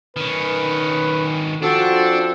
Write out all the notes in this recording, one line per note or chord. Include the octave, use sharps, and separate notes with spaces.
D#3 C#4 B4
F3 C4 D4 F#4 A4